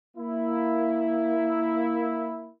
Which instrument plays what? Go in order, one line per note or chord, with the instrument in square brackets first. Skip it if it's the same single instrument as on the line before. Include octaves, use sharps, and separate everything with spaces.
[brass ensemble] A#3 E4